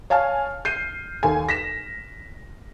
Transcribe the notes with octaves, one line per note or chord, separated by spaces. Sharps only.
C#5 F5 G#5 A5 F6
G6 C7 D#7
D#2 A4 G#5
A#6 B6 E7